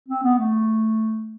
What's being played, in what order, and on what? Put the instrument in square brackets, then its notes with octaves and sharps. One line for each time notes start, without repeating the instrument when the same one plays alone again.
[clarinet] C4
B3
A3